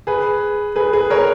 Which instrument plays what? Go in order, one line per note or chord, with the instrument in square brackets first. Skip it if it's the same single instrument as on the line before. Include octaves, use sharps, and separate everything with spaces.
[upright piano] G#4 B4
G#4 B4
G#4 B4
A#4 C#5